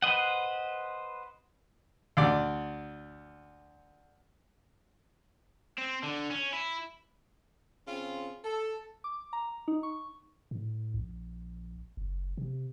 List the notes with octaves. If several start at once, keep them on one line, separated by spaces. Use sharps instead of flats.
B4 C5 D#5 F#5
D2 D5
C4
D3
C#4
E4
C#3 C4 F4
A4
D6
A#5
D#4
C#6
A2
A#1
F#1
C3